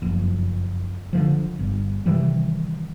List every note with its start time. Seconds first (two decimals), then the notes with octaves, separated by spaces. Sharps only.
0.02 F#1 F2
1.13 D3 E3 F3
1.59 G1
2.06 C3 D#3 E3 G3